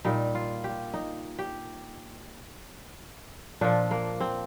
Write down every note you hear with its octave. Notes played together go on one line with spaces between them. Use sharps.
A#2 G3 D#4
F4
G4
D#4
G4
A#2 F3 D4
A#3
C4